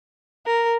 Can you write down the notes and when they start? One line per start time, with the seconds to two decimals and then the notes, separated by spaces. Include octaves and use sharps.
0.46 A#4